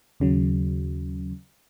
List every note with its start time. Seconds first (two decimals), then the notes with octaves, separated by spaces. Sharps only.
0.20 D#2 C#3 F#3